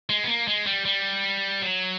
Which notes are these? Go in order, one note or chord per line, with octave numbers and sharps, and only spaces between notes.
G#3
B3
A#3
G#3
G3
G3
F#3